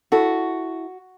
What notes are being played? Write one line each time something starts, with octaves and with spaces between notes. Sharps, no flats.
E4 F#4 A4